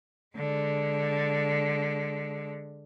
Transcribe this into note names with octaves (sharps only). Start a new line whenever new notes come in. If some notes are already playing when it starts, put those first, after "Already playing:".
D3 G#3